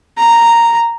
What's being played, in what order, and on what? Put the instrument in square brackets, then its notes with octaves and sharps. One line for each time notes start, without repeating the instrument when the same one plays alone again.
[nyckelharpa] A#5